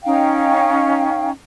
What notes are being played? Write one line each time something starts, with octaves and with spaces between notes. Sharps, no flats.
C#4 D#4 F5 G5